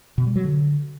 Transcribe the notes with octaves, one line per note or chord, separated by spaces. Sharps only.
B2
G3
F#3
D3